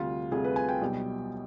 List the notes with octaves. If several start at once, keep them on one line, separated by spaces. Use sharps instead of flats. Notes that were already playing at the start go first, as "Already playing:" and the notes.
Already playing: D2 C3 G3 F4
D2 C3 G3 G#4
B4
G#5
G5
B1 B2 G3